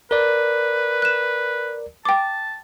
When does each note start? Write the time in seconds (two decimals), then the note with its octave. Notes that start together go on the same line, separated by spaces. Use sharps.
0.11 A#4 B4 D5
1.02 F#6 E7
2.05 G5 A5 D6